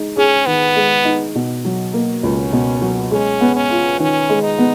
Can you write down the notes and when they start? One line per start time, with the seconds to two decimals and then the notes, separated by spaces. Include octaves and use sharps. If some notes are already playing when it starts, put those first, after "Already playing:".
Already playing: G#3 D#4
0.17 C#4 G#4
0.46 D#3 B3
0.76 G#3
1.05 D#4
1.35 B2
1.65 F#3
1.93 A#3
2.23 C#2 C#4
2.53 B2
2.82 F#3
3.11 G#3 C#4
3.41 B3
3.56 C#4
3.70 F4
3.99 D#3 C#4
4.29 G#3
4.43 D#4
4.58 B3